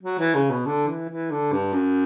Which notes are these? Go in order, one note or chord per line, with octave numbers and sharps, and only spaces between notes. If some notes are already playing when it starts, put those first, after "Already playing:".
F#3
E3
C#3
B2
D3
E3
E3
D3
G2
F#2